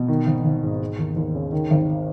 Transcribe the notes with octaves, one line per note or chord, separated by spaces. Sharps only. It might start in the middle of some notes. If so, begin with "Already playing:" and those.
Already playing: B2
D#3
G#1
G#1
G#2
G#3
D#2
D#2
C#3
D#3
G#1